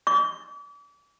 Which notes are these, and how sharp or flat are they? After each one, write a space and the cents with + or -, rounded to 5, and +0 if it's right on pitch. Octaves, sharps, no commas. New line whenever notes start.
D6 -40